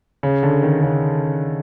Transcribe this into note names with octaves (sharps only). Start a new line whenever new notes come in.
C#3
D3
D#3
C#3